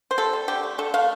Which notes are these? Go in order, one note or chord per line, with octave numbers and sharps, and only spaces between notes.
C5
C3 A4
G3
D3 G4
A3
D3 A4
A3 F5